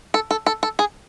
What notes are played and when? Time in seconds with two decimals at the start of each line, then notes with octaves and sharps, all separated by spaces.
0.14 A4
0.31 A4
0.46 A4
0.63 A4
0.79 G#4